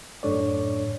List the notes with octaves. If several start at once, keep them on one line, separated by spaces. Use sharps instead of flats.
F#2 A2 D4 A4 C#5 D5